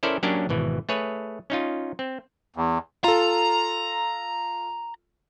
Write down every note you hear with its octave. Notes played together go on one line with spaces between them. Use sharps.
C#4 E4 A4 A#4 C5 D5
F#3 A#3 C#4 D4 G4 A#4
G#1 B2 E3
A3 G#4 B4 C#5
C#4 D#4 F4
C4
E2
F4 A4 A#5